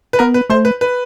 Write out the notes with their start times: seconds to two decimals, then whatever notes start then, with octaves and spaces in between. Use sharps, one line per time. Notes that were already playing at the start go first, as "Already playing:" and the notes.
0.13 B4
0.19 B3 A#4
0.34 B4
0.50 A3 C5
0.65 B4
0.81 B4